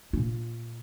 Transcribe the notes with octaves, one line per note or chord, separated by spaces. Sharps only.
A#2 F4